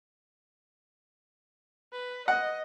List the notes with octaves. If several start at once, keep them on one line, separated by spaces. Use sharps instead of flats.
B4
D#5 F#5